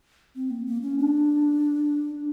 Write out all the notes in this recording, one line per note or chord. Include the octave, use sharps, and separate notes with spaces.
C4
A#3
A#3
C#4
D4